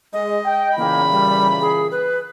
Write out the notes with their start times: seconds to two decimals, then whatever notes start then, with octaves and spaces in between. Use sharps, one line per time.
0.13 G#3 D#5
0.45 G5
0.77 A#2 C#3 E3 A#3 B5
1.11 G3
1.61 G#4
1.91 B4